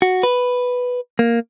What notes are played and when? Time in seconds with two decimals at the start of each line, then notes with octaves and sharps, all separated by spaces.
0.02 F#4
0.23 B4
1.19 A#3